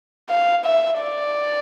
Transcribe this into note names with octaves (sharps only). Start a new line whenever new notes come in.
F5
E5
D5